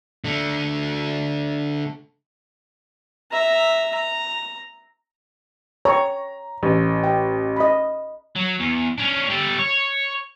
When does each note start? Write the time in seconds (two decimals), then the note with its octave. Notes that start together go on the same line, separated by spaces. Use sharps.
0.24 D3 A3
3.32 E5 A#5
3.94 A#5
5.85 C#5 G5 A#5 C#6
6.63 A1
7.04 G5
7.56 D#5 B5
8.36 F#3
8.60 E2
8.98 C#4 D4
9.30 G3 A4
9.59 C#5